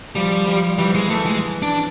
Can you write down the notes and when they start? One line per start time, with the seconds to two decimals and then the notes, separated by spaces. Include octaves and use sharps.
0.15 F3 G3
0.48 F3
0.78 E3 G3
0.95 G#3
1.10 E3 A3
1.26 G#3
1.62 D4